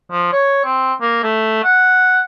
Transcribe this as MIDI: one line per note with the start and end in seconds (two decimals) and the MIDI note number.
0.11 0.32 53
0.33 0.63 73
0.64 0.93 60
1.01 1.22 58
1.23 1.59 57
1.64 2.21 78